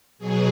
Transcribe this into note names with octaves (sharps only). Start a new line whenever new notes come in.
B2 F#3 G#4